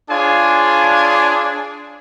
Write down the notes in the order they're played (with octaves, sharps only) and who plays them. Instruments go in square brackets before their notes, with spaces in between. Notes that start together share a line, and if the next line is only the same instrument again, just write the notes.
[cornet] D4 [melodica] F4 C#5 [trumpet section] G#4 F5 G#5